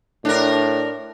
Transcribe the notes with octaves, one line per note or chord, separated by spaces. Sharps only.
A2 D4 A#4